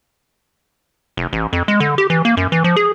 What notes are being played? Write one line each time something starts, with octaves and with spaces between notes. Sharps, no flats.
F1
A1
F2
G#3
D3
G4
E3
A#3
F#2
E3
F3
G#4